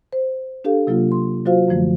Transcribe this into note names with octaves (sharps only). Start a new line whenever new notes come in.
C5
D4 G4 A4 F5
C3 F#3 A#3 F4
C6
F#3 F4 F#4 C5 F5
F#2 D3 F3 A3